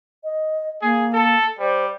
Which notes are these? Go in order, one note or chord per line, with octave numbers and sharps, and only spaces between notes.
D#5
A#3 G#4
A4
G3 C5